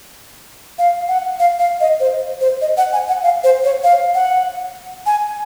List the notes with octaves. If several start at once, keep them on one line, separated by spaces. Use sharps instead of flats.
F5
F#5
F5
F5
D#5
C5
C5
D#5
F#5
G#5
F#5
F5
C5
C#5
F5
F#5
G#5